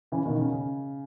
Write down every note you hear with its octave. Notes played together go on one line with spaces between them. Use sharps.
C#3 E3
B2 D#3
C#3
C#3